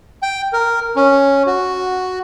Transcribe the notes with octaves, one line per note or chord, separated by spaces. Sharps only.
G5
A#4
C#4
F#4